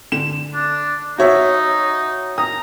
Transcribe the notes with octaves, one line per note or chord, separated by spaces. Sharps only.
D3 E7
D4
D#4 F#4 C#5 E5
A#5 D#6